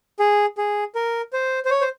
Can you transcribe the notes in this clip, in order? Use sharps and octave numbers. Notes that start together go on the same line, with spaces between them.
G#4
G#4
A#4
C5
C5
C#5
C5